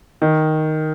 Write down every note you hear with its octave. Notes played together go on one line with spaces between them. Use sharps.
D#3